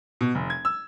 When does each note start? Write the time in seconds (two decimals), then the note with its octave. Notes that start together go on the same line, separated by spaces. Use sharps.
0.21 B2
0.35 F1
0.50 G#6
0.65 E6